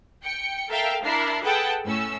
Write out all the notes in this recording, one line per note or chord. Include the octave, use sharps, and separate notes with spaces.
G5 C#7
A4 A#4 E5 F5 G5
D4 E4 A#4 C7
G#4 A4 B4 F#5 G5 A5
A2 C#4 E6